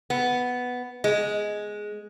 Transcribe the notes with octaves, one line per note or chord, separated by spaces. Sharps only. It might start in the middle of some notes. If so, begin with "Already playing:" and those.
B3
G#3